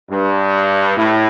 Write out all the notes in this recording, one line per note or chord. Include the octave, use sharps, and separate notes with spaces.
G2
A2